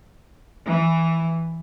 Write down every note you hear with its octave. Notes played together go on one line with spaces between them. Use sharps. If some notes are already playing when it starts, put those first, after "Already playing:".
E3